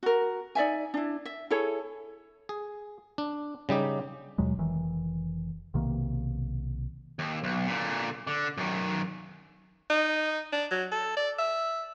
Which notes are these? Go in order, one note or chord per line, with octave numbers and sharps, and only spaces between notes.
F#4 A#4
D#4 D5 E5 G#5
D4 E4
E5
E4 G#4 A4 C#5
G#4
D4
C#3 G3 D#4 G4
D#2 B2 F#3 G#3
F1 D#3 E3
B1 C3 D#3 A#3
D#2
B1
A#2 D3
D3
F#2 D#3
D#4
D4
F#3
A4
D5
E5